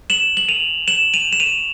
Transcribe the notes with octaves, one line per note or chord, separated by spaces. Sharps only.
E7 F#7
F#7
D#7 F7
E7 F#7
D#7 F7
E7
D#7 F7